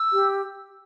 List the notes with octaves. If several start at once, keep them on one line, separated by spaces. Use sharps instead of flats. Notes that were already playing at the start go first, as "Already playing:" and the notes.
Already playing: E6
G4